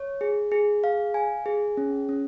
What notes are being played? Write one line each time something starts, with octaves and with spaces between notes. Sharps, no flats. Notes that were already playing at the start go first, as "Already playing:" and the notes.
Already playing: C#5
G#4
G#4
F5
G#5
G#4
C#4
C#4